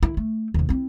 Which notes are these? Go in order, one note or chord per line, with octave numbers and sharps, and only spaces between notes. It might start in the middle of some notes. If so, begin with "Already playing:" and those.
D#3 E4
A3
D#2 C#3
C4 E4